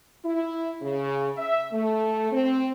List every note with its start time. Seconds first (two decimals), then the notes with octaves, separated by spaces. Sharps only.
0.24 E4
0.82 C#3
1.37 E5
1.72 A3
2.32 C4